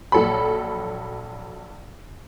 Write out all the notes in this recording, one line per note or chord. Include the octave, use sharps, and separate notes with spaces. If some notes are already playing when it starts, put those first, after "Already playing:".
A#1 F#3 A4 C#5 B5